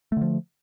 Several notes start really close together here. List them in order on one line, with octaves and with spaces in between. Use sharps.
A3 D3 F3